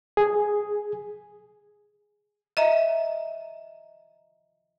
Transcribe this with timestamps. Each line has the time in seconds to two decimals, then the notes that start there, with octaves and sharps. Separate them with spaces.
0.17 G#4
2.57 D#5 E5 A#5